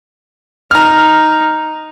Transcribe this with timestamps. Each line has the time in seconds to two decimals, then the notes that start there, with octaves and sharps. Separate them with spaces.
0.71 D#4 A#5 F6